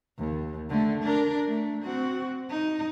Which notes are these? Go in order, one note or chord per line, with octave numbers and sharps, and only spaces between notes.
D#2
D3 A3
D4 A#4
A3
C4 F#4
D#4